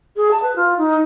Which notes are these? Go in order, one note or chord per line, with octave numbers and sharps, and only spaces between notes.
G#4
A5
B4
F4
D#4